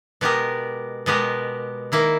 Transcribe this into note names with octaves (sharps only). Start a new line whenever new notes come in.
B2 G#3 B3 G4 A#4
B2 G#3 B3 G4 A#4
D#3 A#3 E4